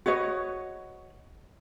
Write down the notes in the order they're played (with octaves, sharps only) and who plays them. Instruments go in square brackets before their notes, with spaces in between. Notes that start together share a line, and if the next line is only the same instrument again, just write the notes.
[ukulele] F#4 B4 C#5 D#5